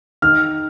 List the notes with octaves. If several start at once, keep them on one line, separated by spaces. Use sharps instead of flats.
D#3 F6